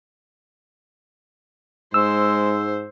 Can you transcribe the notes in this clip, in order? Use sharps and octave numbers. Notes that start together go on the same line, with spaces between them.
G#2 G#3 C5 E6